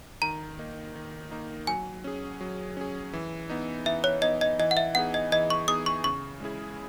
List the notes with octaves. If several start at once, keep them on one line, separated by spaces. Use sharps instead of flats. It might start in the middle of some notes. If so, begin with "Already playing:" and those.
D#3 A#5
A#3 D#4
D#3
A#3 D#4
F#3 G#5
C#4 G#4
F#3
C#4 G#4
E3
B3 D#4
E3 E5
C#5
B3 D#4 D#5
D#5
E3 D#5
F#5
E5
B3 D#4 G#4 F#5
D#5
E3 D#5
C#6
B3 D#4 G#4 D#6
C#6
C#3 C#6
G#3 C#4 E4 G#4